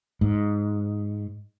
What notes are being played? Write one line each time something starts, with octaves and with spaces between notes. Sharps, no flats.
G#2